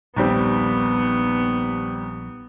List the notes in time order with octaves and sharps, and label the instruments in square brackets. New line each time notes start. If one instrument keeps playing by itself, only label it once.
[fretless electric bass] A#1 [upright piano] D#2 G3 C4 [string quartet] B3